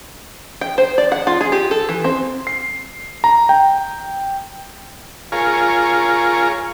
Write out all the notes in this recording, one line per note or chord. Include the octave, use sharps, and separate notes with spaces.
G5
C5
D5
F#5
F4
G#4
G4
A4
E3
C4
C7
A#5
G5
F4 G#4 A#4 C#5